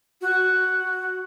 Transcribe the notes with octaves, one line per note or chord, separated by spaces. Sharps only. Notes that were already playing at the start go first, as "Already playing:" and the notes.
F#4